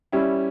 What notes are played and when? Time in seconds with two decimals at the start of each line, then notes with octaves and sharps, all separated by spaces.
0.12 G3 C#4 E4